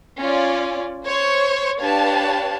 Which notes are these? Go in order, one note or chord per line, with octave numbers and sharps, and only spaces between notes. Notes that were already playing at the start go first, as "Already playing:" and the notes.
C#4 F4 D5
C5 C#5 C#6
D4 G4 B4 C#5 F5 A5